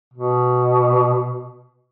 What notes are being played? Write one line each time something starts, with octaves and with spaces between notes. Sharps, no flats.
B2